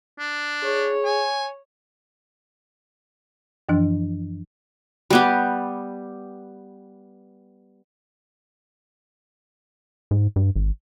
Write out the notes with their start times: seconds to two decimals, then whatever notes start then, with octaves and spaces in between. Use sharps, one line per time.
0.19 D4
0.63 G#4 C#5
1.05 G#5
3.69 F#2 E3 F3 D4
5.10 G3 B3 G4
10.11 G#2
10.36 G2
10.56 G#1